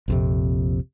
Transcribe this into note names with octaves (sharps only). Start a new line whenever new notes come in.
A#1 F2 C3